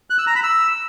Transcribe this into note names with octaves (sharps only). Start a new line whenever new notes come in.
F#6
E6
A#5
B5
E6